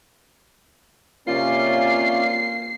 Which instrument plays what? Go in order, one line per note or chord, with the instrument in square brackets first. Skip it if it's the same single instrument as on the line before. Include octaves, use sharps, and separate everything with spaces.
[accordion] C3 C#4 D5 [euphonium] A#3 [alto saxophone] F4 [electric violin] C7